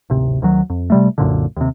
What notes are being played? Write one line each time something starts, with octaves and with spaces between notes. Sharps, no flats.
D1 G#1 C3
D2 D#3 F#3
F2
C3 G3 A3
C2 F#2 A#2 D3
D#2 C3